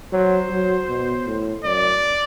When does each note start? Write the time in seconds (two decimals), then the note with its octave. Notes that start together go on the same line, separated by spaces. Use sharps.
0.12 F#3 C5
0.50 F#3
0.88 B2
1.26 A2
1.64 F#2 D5